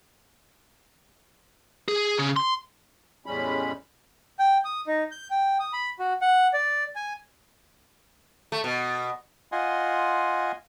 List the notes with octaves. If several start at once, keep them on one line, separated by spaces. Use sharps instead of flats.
G#4
C#3
C6
E2 A2 G3 G#3 C#4 B5
G5
D#6
D#4
G6
G5
D#6
B5
F#4
F#5
D5
G#5
A3
B2
F4 D#5 F#5 G#5 C6